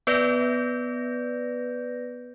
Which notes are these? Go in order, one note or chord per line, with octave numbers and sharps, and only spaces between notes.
B3 B4 D5 G6 A#6